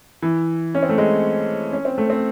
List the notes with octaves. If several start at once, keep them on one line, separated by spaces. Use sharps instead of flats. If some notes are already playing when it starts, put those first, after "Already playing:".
E3
C#4
C4
A3
G#3
C#4
C4
A3
C4